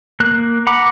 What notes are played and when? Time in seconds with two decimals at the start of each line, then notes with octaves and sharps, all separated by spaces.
0.20 A#3 F#6
0.67 F#5 A#5 B5 D6